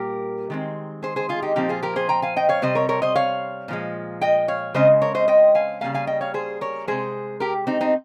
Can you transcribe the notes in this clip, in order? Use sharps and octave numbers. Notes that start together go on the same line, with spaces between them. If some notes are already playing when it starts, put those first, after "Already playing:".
Already playing: A#2 G3 A#3 G4 A#4
D#3 G#3 C4
G#4 C5
G#4 C5
F4 G#4
D#4 G4
A#2 F3 C4 D#4 G4
F4 G#4
G4 A#4
G#4 C5
G5 A#5
F5 G#5
D#5 G5
C#5 F5
C3 G3 C4 C5 D#5
A#4 C#5
A#4 C#5
C5 D#5
C#5 F5
A#2 F3 G#3
D#5 G5
C#5 F5
C#3 G#3 C4 C5 D#5
A#4 C#5
C5 D#5
D#5 G5
F5 G#5
C#3 G3 A#3 F5 G#5
F5 G#5
D#5 G5
C#5 F5
G#4 C5
A#4 C#5
C3 F3 G#3 G#4 C5
G4 A#4
C4 D#4
C4 D#4